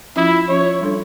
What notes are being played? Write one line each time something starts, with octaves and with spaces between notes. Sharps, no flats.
F3 C#4 E4 F4
F3 C#4 F4 C#5
G3 D4 A4 C#5